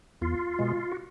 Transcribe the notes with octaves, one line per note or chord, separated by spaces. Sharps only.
E2 F4
B2 G#3
F#4